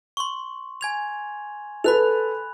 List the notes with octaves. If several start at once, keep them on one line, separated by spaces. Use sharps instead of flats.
C6 C#6
G#5 G#6 F7
A4 B4 B5 F#6 F7